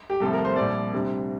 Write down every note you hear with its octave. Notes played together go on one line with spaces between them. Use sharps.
G4
C2 C3 F3 A3 A4
A#4
C5
C2 A#2 F3 D5
D2 C3 G3